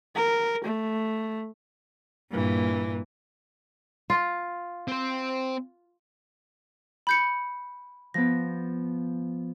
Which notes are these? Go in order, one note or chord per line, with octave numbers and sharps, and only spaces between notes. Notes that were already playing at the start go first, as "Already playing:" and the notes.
A#4
A3
G2 A#2 E3
F4
C4 C5
B5 G6 C#7
F3 B3 A#6